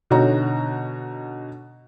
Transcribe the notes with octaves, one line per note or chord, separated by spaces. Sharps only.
B2 D3 D#4 F#4 C#5 A#5